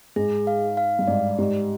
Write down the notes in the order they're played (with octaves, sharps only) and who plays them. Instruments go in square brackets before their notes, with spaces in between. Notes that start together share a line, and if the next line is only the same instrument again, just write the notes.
[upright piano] G#2 [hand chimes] G#4
[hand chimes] F5
F5
[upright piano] G2
[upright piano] G#2 [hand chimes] D5
[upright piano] G#2 [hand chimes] G4